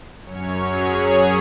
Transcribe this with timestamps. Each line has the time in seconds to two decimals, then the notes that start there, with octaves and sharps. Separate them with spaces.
0.24 F#2 F#3 C#4 C#5
0.66 G#4
1.08 C#5